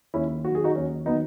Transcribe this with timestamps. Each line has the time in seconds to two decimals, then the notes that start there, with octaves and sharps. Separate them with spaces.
0.14 D#2 C#4 E4
0.45 D#3 F#3 F#4
0.55 G#4
0.64 D#4 F#4
0.76 D#2 C#4
1.06 F#3 B3 D#4
1.11 D#3